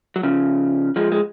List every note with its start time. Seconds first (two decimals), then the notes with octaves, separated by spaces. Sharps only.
0.16 F#3
0.23 C#3 F3
0.96 F3 G#3
1.12 G#3